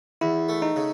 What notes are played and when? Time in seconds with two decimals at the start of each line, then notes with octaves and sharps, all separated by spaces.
0.21 E2 E4
0.49 A3
0.62 D#4
0.76 C#3